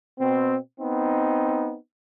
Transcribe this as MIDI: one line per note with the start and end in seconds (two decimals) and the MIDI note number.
0.20 0.56 47
0.20 0.56 60
0.80 1.76 59
0.80 1.76 60
0.80 1.76 63